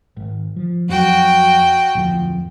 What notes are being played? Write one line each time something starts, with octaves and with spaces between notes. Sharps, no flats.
G#1
F3
F2 F#3 F#4 G5
D1 F2 F3